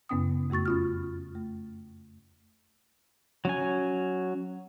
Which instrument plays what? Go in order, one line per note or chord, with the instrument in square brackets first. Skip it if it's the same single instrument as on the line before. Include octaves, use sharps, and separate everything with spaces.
[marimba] F#2 C#3 B3 C#4 G5 D#6
F2 A3 F#4 C#6 A6
C#4 F4 F6
A3
[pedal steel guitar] F#3 C#4 G#5